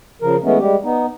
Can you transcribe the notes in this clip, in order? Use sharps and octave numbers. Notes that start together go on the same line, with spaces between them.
C#3 F3 A#4
E3 G#3 A3 B3 C#4
G3 G#3 G4
B3 D#4